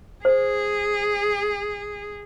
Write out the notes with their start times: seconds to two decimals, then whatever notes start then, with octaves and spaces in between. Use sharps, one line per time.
0.25 G#4 C5